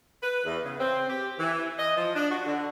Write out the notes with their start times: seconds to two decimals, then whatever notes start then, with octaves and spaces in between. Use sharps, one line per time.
0.23 B4
0.45 E2
0.64 C#3
0.80 C4
1.10 G4
1.39 E3
1.79 D#5
1.97 F3
2.16 D4
2.31 F#4
2.47 D3